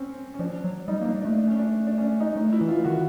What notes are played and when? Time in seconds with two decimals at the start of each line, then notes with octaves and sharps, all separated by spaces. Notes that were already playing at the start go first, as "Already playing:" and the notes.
Already playing: C4 C#4
0.34 C#4
0.39 F3 D4
0.64 F#3
0.88 G3 D#4
1.01 A#3 D4
1.21 A3 D4
1.38 D4
1.47 C#4
1.59 D4
1.87 D4
1.98 C#4
2.03 D4
2.20 D#4
2.36 A3 D4
2.52 E4
2.61 E3
2.68 F4
2.85 D#3 F#4